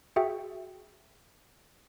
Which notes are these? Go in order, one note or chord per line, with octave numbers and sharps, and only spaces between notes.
F#4 G#4 E5 G5